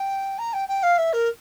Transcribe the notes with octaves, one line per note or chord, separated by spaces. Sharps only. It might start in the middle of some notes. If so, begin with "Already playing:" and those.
Already playing: G5
A#5
G5
G5
F5
E5
A#4